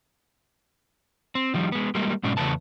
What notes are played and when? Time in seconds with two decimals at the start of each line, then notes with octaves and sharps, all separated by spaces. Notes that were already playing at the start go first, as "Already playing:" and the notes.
1.35 C4
1.54 D#3 F3 G3
1.72 G#3 B3
1.95 G3 G#3 A#3
2.23 G#2 B2 G#3 C#4 D4
2.37 E2 C#3 A3 B4 A5